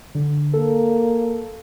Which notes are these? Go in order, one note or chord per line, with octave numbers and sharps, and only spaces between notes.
D3
A#3 A4